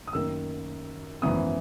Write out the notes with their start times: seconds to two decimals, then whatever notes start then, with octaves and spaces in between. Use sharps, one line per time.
0.07 D#6
0.13 F#2 D#3 A#3 E6
1.22 G#1 F#2 E3 B3 D#6